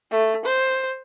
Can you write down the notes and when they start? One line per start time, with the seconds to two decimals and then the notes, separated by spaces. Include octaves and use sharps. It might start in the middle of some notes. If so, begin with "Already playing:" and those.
0.12 A3
0.46 C5